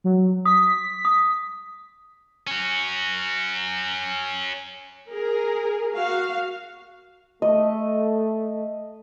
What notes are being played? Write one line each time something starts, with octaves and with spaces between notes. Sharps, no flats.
F#3
D#6 B6
D#6
C#4 F#4
G#4 A#4
F#4 F5
A3 D#5